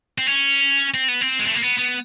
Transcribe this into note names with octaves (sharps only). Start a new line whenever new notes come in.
C4
C#4
C4
B3
C4
G#3
A3
A#3
B3
B3